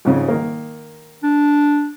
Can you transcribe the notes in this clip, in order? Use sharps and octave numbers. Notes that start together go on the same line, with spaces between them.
F2 G#2 C#3
D#3 A#3
D4